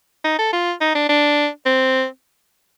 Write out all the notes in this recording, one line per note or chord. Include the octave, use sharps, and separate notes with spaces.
D#4
A4
F4
D#4
D4
D4
C4